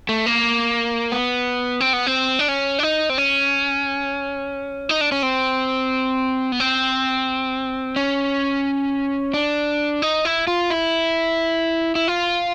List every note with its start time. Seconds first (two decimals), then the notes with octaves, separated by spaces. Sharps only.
0.09 A3
0.26 A#3
1.12 B3
1.81 C4
1.93 B3
2.07 C4
2.39 D4
2.48 C#4
2.79 D4
2.83 D#4
3.10 C4
3.18 C#4
4.89 D#4
5.01 D4
5.12 C#4
5.23 C4
6.52 B3
6.60 C4
7.96 C#4
9.34 D4
10.02 D#4
10.25 E4
10.47 F4
10.70 E4
11.95 E4
12.08 F4